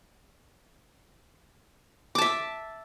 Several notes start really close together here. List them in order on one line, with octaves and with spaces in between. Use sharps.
D6 A5 E5